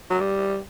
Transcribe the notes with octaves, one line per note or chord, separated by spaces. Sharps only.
F#3
G3